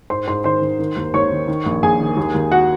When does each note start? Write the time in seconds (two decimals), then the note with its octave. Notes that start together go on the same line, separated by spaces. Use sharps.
0.10 G#2 C5 C6
0.28 G#2 C5 C6
0.44 D#3 C5 C6
0.62 D#3
0.79 D#3
0.97 D#2
1.14 D#2 C#5 C#6
1.32 D#3
1.48 D#3
1.66 A#1
1.82 A#1 G#4 G#5
2.00 D#3
2.17 D#2
2.34 D#2
2.52 F#4 F#5